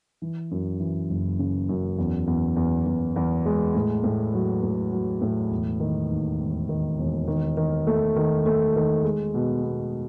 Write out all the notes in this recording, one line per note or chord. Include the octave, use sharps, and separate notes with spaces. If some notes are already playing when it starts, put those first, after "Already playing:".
E3
F#2
E3
F#1
C#3
F#2
E2
E2
E2
E2
E2
G#3
A2
A2
F#3
A2
F#3
A2
E1
D#3
D#2
E1
D#3
E1
D#3
D#3
A3
D#3
A3
D#3
G#3
B2
B3